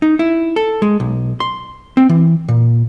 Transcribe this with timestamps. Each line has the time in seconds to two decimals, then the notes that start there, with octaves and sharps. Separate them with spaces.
0.02 D#4
0.19 E4
0.56 A4
0.82 G#3
1.00 B1
1.40 C6
1.97 C4
2.09 E3
2.48 A#2